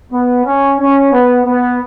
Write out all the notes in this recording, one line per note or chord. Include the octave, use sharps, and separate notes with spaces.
B3
C#4
C#4
B3
B3